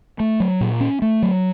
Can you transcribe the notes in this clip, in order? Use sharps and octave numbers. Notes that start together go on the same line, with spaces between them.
A3
F#3
A#2
C#4
A3
F#3